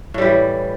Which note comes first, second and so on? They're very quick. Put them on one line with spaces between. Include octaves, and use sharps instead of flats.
A2 G3 E3